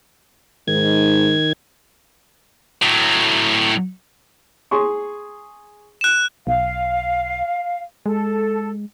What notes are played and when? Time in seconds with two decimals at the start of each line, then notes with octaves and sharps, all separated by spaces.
0.68 G#2 D#3 G#6
2.82 A2 F#3
4.71 G#4 C6 C#6
6.01 F#6 E7
6.47 B1 F5
8.06 G#3 A4